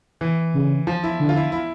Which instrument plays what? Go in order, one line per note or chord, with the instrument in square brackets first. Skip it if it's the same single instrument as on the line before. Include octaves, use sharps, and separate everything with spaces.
[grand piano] E3
[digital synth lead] C#3
[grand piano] F3
E4
[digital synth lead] D3
[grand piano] F4
E4
E4